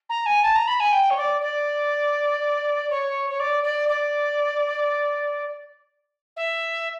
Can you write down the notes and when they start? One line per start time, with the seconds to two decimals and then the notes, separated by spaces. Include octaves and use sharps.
0.09 A#5
0.26 G#5
0.42 A5
0.55 A#5
0.67 B5
0.80 G#5
0.92 G5
1.10 C#5
1.17 D5
1.41 D5
2.90 C#5
3.30 C#5
3.39 D5
3.63 D5
3.89 D5
6.36 E5